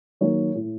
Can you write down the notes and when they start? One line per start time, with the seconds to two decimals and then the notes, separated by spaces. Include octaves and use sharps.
0.21 D#3 F#3 A#3 C#5
0.55 A2